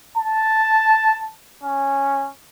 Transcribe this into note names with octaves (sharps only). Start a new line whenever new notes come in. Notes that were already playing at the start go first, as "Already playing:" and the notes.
A5
C#4